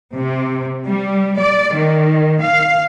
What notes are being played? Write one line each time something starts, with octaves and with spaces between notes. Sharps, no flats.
C3
G3
D5
D#3
F5